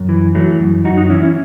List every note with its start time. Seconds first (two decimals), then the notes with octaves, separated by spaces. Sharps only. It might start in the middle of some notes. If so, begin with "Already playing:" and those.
Already playing: F#2
0.09 E3
0.35 E3 F#3 A3
0.59 F#2
0.84 F#2 D#4 F#4
0.97 D#4 F#4
1.10 E3 C#4 E4
1.22 C#4 E4